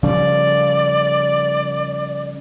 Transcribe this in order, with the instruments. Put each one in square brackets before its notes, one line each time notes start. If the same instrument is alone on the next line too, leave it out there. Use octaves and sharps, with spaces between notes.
[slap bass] C#3 F3 G3 [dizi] D5